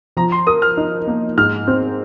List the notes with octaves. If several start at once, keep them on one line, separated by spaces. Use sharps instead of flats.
F3 A#5
C6
A#4 D#6
F6
D#4
A#3
G#2 F6
C4